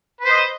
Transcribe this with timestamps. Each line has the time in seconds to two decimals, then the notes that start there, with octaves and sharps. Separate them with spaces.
0.20 B4
0.25 C5
0.30 D#5